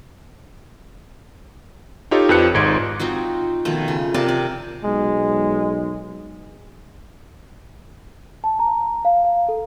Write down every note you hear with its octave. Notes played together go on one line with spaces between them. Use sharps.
D#4 F4 G4 A4 C#5 D#5
F2 F3 G4 B4 F#6 C#7
G#1 G#2 C6 G#6 D7
C4 D#4 F4 F#4
B2 D#3 F3 A3
C#3
C3 A#4 D5 A5
D5
B1 G#3
A5
A#5
F5
F5
A4